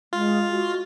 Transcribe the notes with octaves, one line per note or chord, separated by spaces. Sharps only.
G#3 F4
F#4